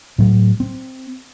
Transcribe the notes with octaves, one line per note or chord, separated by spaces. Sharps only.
A2 F#3
C4